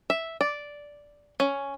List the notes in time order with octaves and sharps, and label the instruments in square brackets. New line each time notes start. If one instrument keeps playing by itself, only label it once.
[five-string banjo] E5
D5
C#4